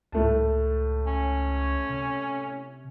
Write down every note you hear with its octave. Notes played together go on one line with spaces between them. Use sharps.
C#2 A2 A3 A5
C#4
C3